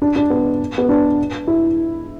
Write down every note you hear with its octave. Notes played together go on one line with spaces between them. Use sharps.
D4
D4
B3
B3
D4
E4